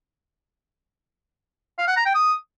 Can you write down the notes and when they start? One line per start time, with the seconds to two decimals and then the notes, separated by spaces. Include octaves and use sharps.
1.78 F5
1.87 F#5
1.96 A#5
2.06 G5
2.15 D#6